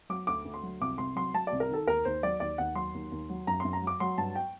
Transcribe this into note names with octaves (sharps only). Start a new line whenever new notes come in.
F#3 D6
D2 D6
D2
C6
F#3
C2 D6
C2 C6
F#3 C6
F#3 A5
D5
C2
A#4
D#3 A4
D#2 A#4
D#2 C5
F#3 D5
D#2 D5
D#2 F#5
F#3 C6
D#2
D#2
F#3
F#2 A#5
F#2 C6
A#5
F#3
D6
F#3 C6
G2 A5
G5